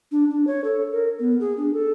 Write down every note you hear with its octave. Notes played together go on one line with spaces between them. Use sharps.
D4
D4
C#5
A4
A#4
B3
G#4
D4
A4